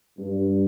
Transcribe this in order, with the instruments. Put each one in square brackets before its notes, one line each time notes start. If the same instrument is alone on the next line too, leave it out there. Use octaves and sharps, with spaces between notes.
[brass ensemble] G2